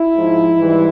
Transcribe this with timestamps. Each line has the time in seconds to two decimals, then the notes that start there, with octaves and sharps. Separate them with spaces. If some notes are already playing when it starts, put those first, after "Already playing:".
Already playing: E4
0.14 G#2 F3
0.57 G#2 E3 G3